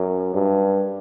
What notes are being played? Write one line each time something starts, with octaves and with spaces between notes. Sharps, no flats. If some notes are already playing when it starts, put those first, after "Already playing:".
Already playing: F#2
G2